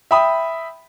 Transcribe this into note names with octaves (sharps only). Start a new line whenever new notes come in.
E5 G5 B5 D#6